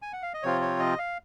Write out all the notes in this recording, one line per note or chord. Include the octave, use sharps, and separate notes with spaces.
G#5
F#5
F5
D#5
C3 F3 C4 F4 C#5
C#5
D#5
F5